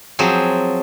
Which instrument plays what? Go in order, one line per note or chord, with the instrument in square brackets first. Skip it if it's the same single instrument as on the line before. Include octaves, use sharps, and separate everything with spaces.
[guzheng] F3 F#3 C4 G#4